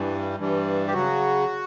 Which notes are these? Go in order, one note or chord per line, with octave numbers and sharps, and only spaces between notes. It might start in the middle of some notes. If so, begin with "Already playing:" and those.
Already playing: G2 E3 G3
G2 E3 G3
G4
C#3 F#3 F#4